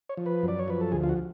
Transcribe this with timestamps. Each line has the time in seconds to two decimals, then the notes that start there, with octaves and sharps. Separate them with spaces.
0.09 C#5
0.17 F3
0.26 B4
0.43 F#2
0.48 D5
0.59 C#5
0.68 F3 B4
0.81 A4
0.92 D2 G#4
1.03 F4
1.09 F#4